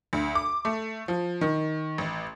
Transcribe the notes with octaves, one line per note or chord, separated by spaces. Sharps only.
D2
D6
A3
F3
D#3
A1